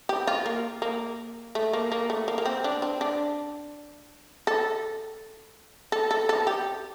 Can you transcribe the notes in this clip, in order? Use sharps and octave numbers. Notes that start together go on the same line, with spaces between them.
G4
F4
A#3
A#3
A3
A#3
A#3
A3
A#3
A#3
C4
D4
C4
D4
A4
A4
A4
A4
G4